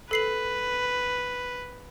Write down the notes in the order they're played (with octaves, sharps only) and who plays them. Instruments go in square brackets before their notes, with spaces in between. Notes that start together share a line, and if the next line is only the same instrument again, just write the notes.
[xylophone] A4 C7 F#7 [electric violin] B4